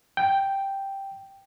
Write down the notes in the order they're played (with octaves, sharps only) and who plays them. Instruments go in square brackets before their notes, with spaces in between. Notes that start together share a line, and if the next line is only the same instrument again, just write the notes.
[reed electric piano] G5